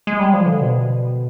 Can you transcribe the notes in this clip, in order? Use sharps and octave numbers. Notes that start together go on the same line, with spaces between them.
G#3
G3
F3
D3
B2